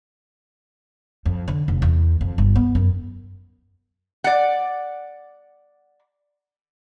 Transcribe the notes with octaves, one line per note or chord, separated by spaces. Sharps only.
F2
D3
F1
E2
F2
G1
B3
F#2
D5 F#5